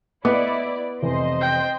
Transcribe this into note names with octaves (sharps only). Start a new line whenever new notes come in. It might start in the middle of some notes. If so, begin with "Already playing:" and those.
B3 E4 B4 D5 D#5 D6
F1 E3 C5 D#5 C6
G5